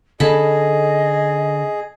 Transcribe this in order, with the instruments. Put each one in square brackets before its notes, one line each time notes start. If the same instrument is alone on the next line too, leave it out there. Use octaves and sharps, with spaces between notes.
[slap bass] D3 C#4 [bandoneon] G#4 [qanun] A4 B5 [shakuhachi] D#5